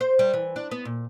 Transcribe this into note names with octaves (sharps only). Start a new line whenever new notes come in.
C5
G3
E3
D4
B3
A#2